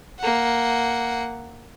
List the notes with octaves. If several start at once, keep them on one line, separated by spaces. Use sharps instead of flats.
A#3 F#5